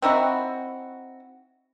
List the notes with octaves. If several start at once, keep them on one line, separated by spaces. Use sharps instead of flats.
C4 D#4 E4 F#4